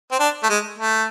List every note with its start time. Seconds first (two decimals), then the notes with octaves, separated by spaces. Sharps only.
0.11 C4
0.19 D4
0.43 A3
0.49 G#3
0.78 A3